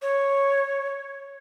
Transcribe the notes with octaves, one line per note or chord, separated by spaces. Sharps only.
C#5